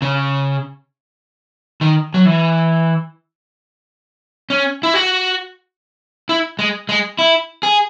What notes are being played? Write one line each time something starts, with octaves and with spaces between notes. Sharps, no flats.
C#3
D#3
F#3
E3
C#4
E4
F#4
E4
G#3
G#3
E4
G#4